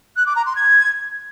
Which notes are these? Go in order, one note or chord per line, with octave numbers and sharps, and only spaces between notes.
F#6
D6
A#5
C6
G#6